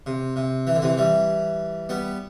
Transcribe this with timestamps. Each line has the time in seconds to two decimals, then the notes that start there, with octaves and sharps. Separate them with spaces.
0.06 C3
0.36 C3
0.67 E3
0.75 D3
0.82 C3 E3
0.97 E3 G3
1.89 G3 B3